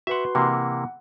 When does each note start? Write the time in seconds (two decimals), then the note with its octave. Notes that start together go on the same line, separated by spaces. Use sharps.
0.07 F#4 B4 E5 F#5 C6
0.35 C3 E3 A#3 F#5